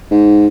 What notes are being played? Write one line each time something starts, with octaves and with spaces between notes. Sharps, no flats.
G#2